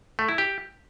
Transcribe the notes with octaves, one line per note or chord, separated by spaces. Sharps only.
A3
E4
G4